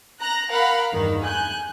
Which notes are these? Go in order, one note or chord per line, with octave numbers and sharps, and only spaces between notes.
A#5 F#6 A#6
A#4 F5 F#5 B5
E2 G2 D#3
G#5 F#6 G6